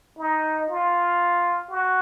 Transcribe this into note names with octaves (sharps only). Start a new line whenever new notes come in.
D#4
F4
F#4